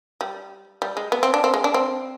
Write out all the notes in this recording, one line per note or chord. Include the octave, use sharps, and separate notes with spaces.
G3
G3
G#3
B3
C4
D4
C4
G#3
D4
C4